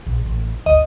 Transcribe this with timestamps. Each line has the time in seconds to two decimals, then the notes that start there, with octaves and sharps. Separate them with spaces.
0.06 A#1
0.25 A1
0.66 G1 D2 D#5